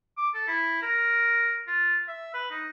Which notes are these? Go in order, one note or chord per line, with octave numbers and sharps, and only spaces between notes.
D6
A4
E4
A#4
F4
E5
B4
D#4